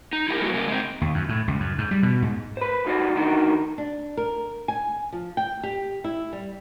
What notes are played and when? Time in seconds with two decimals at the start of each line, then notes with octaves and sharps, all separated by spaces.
0.13 D#4
0.28 E4 G4 A#4
0.41 F#3 G#3 B3 E4 F#4
0.54 C#3 A#3 C#4 A#4
0.68 G#3 C4
1.01 D#2
1.14 F#2
1.29 A2
1.48 C#2
1.60 F#2
1.78 G#2
1.91 G3
2.03 B2
2.22 G#2
2.57 B4 C5
2.84 B1 G2 D#4 F4 F#4 D5
3.15 D#3 E3 D4 D#4 F#4 A#4
3.78 D4
4.17 A#4
4.68 G#5
5.12 F3
5.37 G5
5.63 G4
6.04 E4
6.33 G3